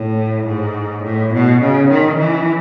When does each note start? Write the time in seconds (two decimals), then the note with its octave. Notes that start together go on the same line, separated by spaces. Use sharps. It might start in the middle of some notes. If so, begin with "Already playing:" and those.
Already playing: A2
0.47 G#2
1.04 A2
1.33 B2
1.61 C#3
1.89 D#3
2.17 E3